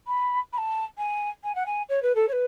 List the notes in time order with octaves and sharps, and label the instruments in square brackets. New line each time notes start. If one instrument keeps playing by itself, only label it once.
[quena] B5
B5
A5
G#5
G#5
F#5
G#5
C#5
B4
A4
C#5
B4